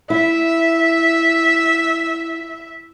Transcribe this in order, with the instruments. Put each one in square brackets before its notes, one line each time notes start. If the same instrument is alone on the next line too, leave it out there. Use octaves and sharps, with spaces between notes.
[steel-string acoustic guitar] E4 [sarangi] E5